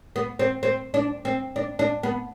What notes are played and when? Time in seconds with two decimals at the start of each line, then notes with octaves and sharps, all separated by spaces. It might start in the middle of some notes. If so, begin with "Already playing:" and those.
0.16 B3
0.39 C4
0.63 C4
0.94 D4
1.25 C4
1.56 D4
1.79 D4
2.03 B3